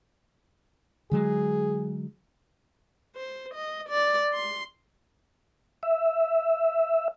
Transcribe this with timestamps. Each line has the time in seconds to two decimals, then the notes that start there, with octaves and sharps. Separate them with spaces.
1.11 D3 F#3 G#3 G#4
3.16 C5
3.54 D#5
3.89 D5
4.34 C6
5.83 E5